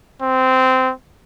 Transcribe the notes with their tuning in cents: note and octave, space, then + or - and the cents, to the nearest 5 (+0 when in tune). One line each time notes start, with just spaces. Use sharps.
C4 -15